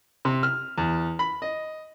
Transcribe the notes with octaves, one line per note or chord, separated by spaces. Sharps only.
C3
F6
E2
B5
D#5